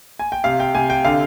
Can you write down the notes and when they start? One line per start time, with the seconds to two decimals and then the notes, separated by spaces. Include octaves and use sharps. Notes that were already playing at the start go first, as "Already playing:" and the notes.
0.19 G#5
0.32 G5
0.44 C3 F5
0.60 G5
0.75 C3 G#5
0.90 G5
1.05 D3 F5